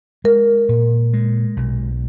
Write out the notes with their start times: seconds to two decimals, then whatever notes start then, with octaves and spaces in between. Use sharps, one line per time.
0.24 G#3 A#4
0.69 A#2
1.13 G#3
1.57 B1